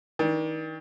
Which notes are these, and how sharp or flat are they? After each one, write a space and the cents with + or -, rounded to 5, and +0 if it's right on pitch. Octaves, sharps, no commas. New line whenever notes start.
D#3 +35 D4 +20